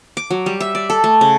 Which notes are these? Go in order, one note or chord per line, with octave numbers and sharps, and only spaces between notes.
D6
F#3
G3
E5
D5
A4
A3
C#3